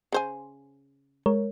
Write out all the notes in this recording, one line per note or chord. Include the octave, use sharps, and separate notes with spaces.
C#3 C5 G#5
G#3 A#4 C#5